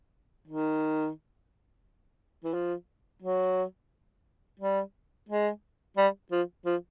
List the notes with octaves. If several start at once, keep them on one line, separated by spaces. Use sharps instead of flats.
D#3
E3
F3
F#3
G3
G#3
G3
F3
F3